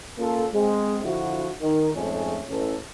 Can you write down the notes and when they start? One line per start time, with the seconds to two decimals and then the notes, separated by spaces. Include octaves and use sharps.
0.18 A#3 C#4 F4 A4
0.53 G#3 C4
1.04 D3 F3 E4 F#4
1.61 D#3
1.95 F2 G#2 G#3 A3 C#4 G#4
2.50 A1 E3 C#4 A4